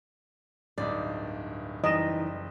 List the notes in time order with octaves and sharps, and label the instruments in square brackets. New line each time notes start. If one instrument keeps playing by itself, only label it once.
[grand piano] D1 G2 D#4 [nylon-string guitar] D5
[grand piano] F#1 E7 [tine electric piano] E3 D#4 [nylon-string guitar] G3 [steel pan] D#5